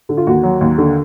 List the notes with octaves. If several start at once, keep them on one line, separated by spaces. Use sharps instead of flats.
D3
F4
D#2 F#4
F#3
D#2
D3